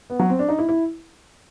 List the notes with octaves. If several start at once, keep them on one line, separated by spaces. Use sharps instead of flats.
B3
F#3
C4
D4
D#4
E4
E4